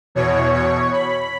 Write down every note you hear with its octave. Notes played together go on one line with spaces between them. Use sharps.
E2 B2 C#5
C#5
B5